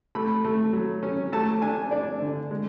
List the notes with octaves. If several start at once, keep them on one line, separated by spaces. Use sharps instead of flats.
A3 B5
A3
F#3
C#4
A3 A5
D4 G#5
D4 D5
D3
G#3